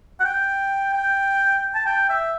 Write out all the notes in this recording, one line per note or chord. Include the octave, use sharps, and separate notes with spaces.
F#5
G5
G5
A5
G5
E5